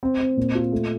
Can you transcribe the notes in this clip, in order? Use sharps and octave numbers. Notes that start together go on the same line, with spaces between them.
C4
C4
A#2
F4
A3